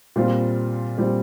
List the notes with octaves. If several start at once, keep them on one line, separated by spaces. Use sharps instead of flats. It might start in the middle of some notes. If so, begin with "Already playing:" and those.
A#2 G3 C4 F4
A#2 G3 C4 F4